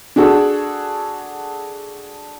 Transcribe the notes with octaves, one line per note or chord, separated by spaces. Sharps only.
D4 F#4 G#4 A4